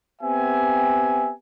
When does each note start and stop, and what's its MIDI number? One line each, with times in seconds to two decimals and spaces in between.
0.22 1.32 59
0.22 1.32 60
0.22 1.32 67
0.22 1.32 76
0.22 1.32 80